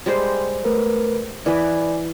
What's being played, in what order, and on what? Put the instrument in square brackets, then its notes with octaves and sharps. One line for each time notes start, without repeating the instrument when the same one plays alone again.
[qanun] G3 G#3 C5
[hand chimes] A3 A#4 B4
[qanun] E3 B4 [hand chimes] D5 G#5